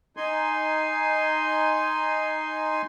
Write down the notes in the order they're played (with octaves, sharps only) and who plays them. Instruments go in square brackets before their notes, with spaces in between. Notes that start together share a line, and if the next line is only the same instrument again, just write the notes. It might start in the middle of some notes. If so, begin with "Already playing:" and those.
[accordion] D#4 G#5 C6